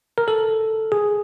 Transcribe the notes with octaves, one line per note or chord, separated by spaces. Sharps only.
A#4
A4
G#4